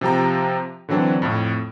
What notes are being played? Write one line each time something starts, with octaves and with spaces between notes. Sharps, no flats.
C3 F3 G4 A#5
D3 E3 F#3 C4 D4
F2 A2